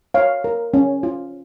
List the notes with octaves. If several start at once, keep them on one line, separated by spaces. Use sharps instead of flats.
C#5 F5
A#4
C#4
F4